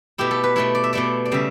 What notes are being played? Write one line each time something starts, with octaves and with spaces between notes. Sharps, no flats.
B2 A3 E4 G4
A4
B4
B2 A3 E4 C#5
D5
E5
B2 A3 E4 D5
D5
C#3 G3 E5